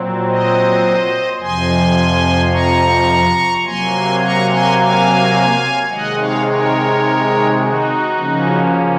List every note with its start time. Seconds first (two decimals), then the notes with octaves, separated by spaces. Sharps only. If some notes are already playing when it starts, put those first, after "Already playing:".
Already playing: A#2 F#3 C4
0.28 C5 D#5
1.40 F2 C3 F3 G#5 C6
2.52 A#5 C#6
3.65 C3 F#3 A#3 G#5 C6
4.21 A#5 C#6
4.49 G#5 C6
4.78 F5 G#5
5.90 C3 D#3 G#3 D#5 F#5
6.18 C#5 F5
6.46 A#4 C#5
7.59 D#4 F#4
8.15 C#3 F3 A#3 C#4